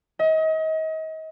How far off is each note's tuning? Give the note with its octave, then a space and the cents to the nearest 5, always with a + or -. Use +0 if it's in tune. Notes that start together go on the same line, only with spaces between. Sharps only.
D#5 +35